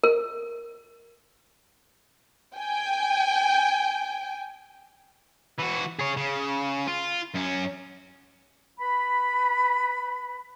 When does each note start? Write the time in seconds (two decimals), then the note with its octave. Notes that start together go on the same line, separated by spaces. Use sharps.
0.04 A#4
2.57 G5 G#5
5.58 E3 F#4
5.99 G#4 C#5
6.17 C#3
6.87 F4
7.34 F#2 C#4
8.79 B4 B5